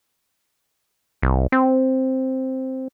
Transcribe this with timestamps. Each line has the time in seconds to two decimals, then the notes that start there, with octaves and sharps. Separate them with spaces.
1.22 C2
1.52 C4